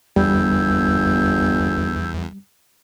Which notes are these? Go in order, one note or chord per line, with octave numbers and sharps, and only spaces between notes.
G1 E2 G3 E6 G6 G#6